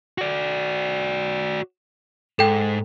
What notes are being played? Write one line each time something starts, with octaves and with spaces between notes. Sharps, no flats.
F#4 D5
G#2 A4 G5